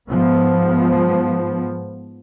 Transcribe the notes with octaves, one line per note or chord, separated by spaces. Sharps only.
G#2 F3 B3